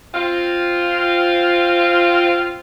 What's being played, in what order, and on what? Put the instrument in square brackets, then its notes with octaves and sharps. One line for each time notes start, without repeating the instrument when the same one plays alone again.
[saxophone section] C4 F4